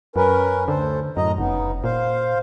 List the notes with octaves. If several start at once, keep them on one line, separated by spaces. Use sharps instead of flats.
F#2 C#4 A#4 B4
D2 D3 A4 C5
F#2 A2 D#5 A#5
F1 C#3 B3 D#4
A#2 C5 F5